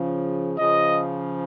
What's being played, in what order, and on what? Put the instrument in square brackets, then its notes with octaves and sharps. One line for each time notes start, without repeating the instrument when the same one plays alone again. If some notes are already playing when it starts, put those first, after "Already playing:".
Already playing: [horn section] C#3 F3
C#3 F3 D#5